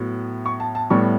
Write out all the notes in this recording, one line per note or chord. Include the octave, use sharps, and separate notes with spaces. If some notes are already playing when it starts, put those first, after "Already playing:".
Already playing: A2 F#3 B3
C#6
A5
A5
A2 G3 B3 C#6